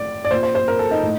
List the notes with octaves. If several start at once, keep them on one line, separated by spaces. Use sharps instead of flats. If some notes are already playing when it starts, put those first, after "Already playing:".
Already playing: A2 D5
D5
A#2 C5
C5
C5
A#4
A4
D#4
A2